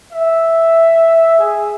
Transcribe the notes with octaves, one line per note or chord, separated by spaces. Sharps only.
E5
G#4